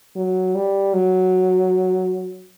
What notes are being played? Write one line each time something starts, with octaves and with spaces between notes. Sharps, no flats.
F#3
G3
F#3